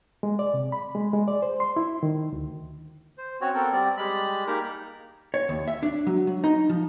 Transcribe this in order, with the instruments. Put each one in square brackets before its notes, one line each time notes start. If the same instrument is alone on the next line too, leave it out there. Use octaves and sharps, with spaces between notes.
[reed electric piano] G#3
D5
C3
B5
G#3
G#3
D5
C5
C6
E4
D#3
D2
[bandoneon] C5
C4 C#4 F#4 C#5
B3 C4 A4 A#4
G3 C4 D5
G3 G#3 B5
A#3 D#4 G4 G#4 A#4
[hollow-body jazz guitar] C#5
D#2
E5
D4
F#3
F#3
D#4
F3